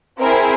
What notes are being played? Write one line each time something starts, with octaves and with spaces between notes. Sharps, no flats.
C4 E4 G#4 A#4